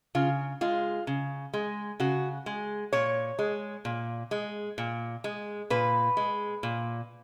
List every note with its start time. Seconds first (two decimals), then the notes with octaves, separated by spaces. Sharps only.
0.15 C#3 F4
0.61 G#3 F4
1.07 C#3
1.53 G#3
2.00 C#3 F#4
2.46 G#3
2.93 A#2 C#5
3.39 G#3
3.85 A#2
4.31 G#3
4.78 A#2
5.24 G#3
5.70 A#2 B4
6.17 G#3
6.63 A#2